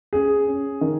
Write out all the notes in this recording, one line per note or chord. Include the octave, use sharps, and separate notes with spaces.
C#4 G#4
C#4
D#3